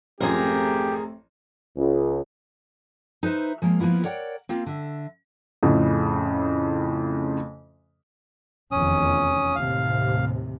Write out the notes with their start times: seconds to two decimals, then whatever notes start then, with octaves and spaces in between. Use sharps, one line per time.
0.21 A1 F#2 F3 A3 C4 G4 G#4 A#4
1.77 C#2
3.23 D#4 B4 C5 E5
3.62 F3 G#3 A#3
3.80 F3 A#3 B3 E4 F4
4.04 A#4 C#5 D5 F#5 G5
4.49 A#3 C4 F4
4.66 D3 E5
5.63 F2 A2 C#3
8.72 F1 E2 D#3 C#4 D#6
9.56 D#2 A2 C3 F5